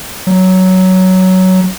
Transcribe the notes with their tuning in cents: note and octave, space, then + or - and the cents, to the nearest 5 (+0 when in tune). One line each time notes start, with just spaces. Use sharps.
F#3 +10